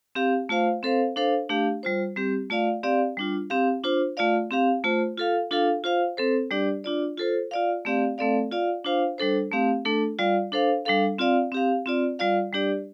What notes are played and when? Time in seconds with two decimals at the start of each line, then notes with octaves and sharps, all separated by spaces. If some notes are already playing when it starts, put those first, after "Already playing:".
0.15 C4 G4 F5
0.49 A3 F4 C5 F5
0.83 C4 A4 C5 F5
1.16 D4 A4 C5 F5
1.49 A3 D4 G4 F5
1.83 G3 F4 C5
2.16 G3 C4 G4
2.50 A3 F4 D5 F5
2.83 C4 G4 D5 F5
3.17 G3 D4 F4
3.50 C4 G4 F5
3.84 D4 F4 C5
4.17 A3 F4 D5 F5
4.51 C4 G4 F5
4.84 A3 F4 C5
5.18 F4 A4 F5
5.51 D4 F4 A4 F5
5.84 F4 C5 F5
6.17 C4 A4 C5
6.51 G3 D4 G4 D5
6.84 D4 F4 D5
7.18 F4 A4 C5
7.51 F4 D5 F5
7.85 A3 C4 G4 D5 F5
8.18 A3 C4 A4 D5 F5
8.52 F4 D5 F5
8.84 D4 F4 C5 F5
9.18 G3 D4 A4 C5
9.52 A3 C4 G4 F5
9.85 A3 D4 A4
10.19 G3 F4 D5 F5
10.52 D4 A4 C5 F5
10.85 G3 D4 A4 F5
11.19 C4 F4 D5 F5
11.52 C4 G4 F5
11.86 C4 F4 D5
12.19 G3 F4 D5 F5
12.53 G3 D4 G4 D5